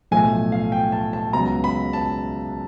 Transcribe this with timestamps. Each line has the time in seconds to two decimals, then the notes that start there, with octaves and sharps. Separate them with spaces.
0.11 B1 A2 F3 A3 G#5
0.52 F5
0.72 G5
0.92 A5
1.13 A5
1.33 C#2 C#3 F#3 B3 A#5
1.64 B5
1.93 A5